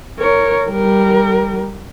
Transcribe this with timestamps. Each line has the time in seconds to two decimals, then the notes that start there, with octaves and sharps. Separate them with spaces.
0.19 A#4 C#5
0.70 G3 A#4